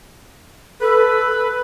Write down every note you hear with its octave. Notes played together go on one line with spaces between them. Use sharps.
A4 B4